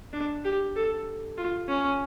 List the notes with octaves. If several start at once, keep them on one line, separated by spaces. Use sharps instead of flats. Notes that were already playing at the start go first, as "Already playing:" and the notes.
D4
G4
A4
F4
C#4